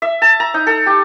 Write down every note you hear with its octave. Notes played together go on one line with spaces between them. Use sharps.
E5
A5
A#5
D#4
A4
G4